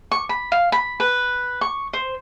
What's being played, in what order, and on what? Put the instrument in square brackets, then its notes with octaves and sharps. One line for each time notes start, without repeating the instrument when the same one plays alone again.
[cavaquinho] C#6
B5
F5
B5
B4
C#6
C5